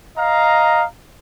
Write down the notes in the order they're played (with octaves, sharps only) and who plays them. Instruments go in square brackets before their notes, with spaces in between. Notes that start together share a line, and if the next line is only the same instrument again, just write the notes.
[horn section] D#5 F5 A#5